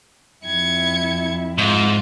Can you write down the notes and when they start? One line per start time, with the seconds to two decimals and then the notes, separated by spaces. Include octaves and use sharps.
0.45 F2 E4 G#6 C#7
1.58 G#2 F4 F5